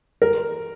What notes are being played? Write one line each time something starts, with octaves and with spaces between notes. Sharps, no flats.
A#4